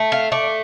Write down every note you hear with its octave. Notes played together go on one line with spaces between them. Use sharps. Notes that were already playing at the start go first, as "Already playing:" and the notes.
Already playing: A3
F5
A3 D5